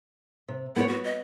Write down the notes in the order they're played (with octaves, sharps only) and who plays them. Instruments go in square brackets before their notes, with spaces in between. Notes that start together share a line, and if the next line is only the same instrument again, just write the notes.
[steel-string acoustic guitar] C3
[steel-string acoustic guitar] B3 C5 C#5 [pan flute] E4
[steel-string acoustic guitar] B3 [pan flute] F#4
[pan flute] D#5